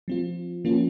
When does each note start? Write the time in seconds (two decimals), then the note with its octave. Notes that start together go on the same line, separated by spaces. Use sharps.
0.08 F3 C4 F4
0.65 F3 A#3 C#4 F4